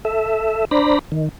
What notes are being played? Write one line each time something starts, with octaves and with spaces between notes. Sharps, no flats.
A4 E5
D4 C5 D5 A#5 B5
D#3